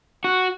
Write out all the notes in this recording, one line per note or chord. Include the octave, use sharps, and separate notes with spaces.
F#4